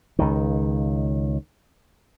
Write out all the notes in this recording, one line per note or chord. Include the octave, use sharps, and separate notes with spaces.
C#2 D#3